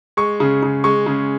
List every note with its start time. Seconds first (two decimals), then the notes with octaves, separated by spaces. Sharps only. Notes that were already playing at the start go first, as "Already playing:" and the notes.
0.17 G#3 C#6
0.40 C#3
0.63 C#3
0.84 G#3 C#6
1.06 C#3